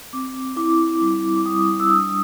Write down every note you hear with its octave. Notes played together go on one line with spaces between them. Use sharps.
C4 D6
E4 D6
G3
D6
G3 D#6
E6
D4 D#6